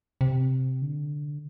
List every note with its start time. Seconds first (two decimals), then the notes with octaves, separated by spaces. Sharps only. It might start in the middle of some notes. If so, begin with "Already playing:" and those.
0.21 C3
0.82 D3